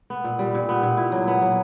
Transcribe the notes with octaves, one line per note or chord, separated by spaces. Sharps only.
B3
A#2
G3
A#2
B3
A#2
E4
F#3
B3
F#3